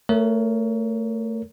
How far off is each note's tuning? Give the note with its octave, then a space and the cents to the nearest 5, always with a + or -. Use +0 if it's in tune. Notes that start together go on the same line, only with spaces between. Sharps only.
A3 +25 A#4 +0 C#5 +25